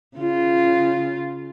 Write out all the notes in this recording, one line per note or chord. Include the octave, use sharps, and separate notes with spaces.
C#3 F4